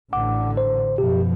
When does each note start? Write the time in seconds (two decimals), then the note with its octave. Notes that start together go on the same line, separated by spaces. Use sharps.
0.13 A1 D3 F#5 D6
0.57 C5
0.98 F#2 B2 F3 G4